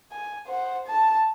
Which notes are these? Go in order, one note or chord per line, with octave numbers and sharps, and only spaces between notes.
G#5
C5 F#5
A5